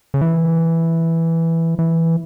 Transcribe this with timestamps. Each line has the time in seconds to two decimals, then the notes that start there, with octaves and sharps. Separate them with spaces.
0.14 C#3
0.21 E3
1.79 E3